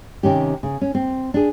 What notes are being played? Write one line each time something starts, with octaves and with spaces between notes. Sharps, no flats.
C3 D#3 C#4 G4
C#3
C#4
C4
D4 G#4